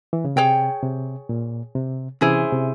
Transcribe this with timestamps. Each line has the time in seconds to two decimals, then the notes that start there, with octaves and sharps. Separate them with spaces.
0.13 E3
0.25 C#3
0.36 C3 G#4 C#5 G5
0.83 C3
1.29 A#2
1.75 C3
2.21 C3 E3 C#4 E4 G#4 C5
2.52 C3